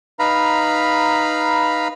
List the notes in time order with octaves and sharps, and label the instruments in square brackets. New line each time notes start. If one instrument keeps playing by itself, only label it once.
[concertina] D#4 B4 F5 A#5 B5